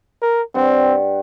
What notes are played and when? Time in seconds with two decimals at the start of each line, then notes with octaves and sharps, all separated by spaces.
0.22 A#4
0.55 G2 C4 F#5